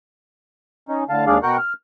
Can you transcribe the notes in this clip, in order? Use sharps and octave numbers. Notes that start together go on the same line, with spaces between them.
C#4 D#4
A2 D3 F5 A5
D#2 G#3 D4 G#4 D5 F5
B2 F#4 A#4 F#5 G5 F#6
F6